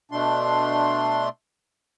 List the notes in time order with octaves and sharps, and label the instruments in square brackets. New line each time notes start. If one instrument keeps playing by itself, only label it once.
[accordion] B2 A3 D4 C6